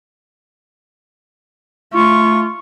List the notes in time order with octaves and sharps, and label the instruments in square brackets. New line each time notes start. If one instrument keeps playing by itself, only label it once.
[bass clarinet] A3 [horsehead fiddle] F4 [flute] C#6